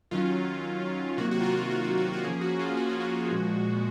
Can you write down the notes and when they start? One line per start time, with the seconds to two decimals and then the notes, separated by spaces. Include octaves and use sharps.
0.11 D#3 F#3 C#4 F4
1.18 C3 D#3 F#3 A#3 F#4
1.31 F#4
1.41 F4
1.44 F#4
1.57 F4
1.71 F#4
1.84 F#4
1.97 F#4
2.13 F#4
2.24 F3 A#3 C#4 G#4
2.41 F#4
2.59 F4
2.77 F#4
2.89 F4
3.00 F#4
3.31 A#2 F3 G#3